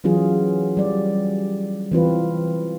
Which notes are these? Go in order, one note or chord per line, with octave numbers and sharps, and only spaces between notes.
E3 F#3 C#4 F4 G#4
G3 D5
E3 C4 F4 B4